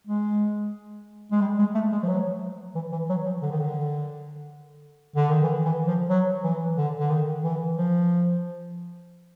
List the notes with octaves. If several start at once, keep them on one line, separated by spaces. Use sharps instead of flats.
G#3
G#3
G3
G#3
A3
G#3
F3
F#3
E3
E3
F#3
F3
D3
D#3
D3
D3
D#3
E3
E3
F3
F#3
E3
D3
D3
D#3
E3
F3